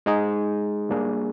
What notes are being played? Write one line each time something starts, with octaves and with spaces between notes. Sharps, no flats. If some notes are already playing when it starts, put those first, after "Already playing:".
G#3 D#4 G#4
G3 A#3 D4 G#4